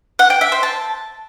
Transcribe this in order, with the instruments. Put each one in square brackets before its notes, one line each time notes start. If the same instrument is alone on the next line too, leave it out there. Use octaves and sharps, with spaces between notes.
[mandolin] F#5
G5
E5
C5
A5